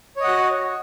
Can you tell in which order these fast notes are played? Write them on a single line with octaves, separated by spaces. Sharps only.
C#5 D#5 F#5 F#4